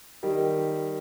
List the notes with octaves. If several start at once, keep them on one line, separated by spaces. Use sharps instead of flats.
D#3 G3